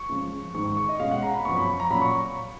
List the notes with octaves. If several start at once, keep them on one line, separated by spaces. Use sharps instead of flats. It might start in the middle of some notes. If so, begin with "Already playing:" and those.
Already playing: C#6
C#3 F3 G#3 C#4
G#2 D#3 G#3 C#6
C#6
C#6
D#5
B2 G#3 C#4 F5
F#5
A#5
B5
F#2 F3 B3 C#6
B5
A#5
A#2 F#3 C#4 B5
C#6